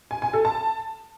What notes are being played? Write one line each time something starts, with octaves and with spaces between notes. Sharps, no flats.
G#5
G#5
A4
A5